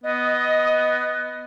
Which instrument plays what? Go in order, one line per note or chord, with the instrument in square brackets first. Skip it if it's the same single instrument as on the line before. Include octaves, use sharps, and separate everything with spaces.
[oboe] B3 [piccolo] D#5